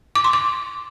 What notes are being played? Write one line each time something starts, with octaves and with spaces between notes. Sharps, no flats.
D6
C6
D6